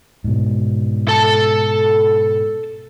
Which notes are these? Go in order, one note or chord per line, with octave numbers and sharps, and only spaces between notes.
G#2 B2
A4 A5